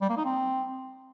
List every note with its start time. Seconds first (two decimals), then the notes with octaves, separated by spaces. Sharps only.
0.02 G3
0.09 A#3
0.17 D#4
0.25 C4